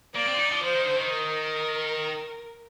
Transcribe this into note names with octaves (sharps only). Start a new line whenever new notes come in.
A#3 D5
C4
F4
D#4
F3
F3 C5
D#3
D3
D#3
A#4